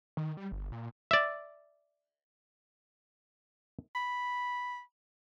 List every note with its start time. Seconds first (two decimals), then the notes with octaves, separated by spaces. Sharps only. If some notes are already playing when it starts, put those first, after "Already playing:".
0.17 D#3
0.37 G3
0.52 G1
0.72 A#2
1.11 D5 E5
3.95 B5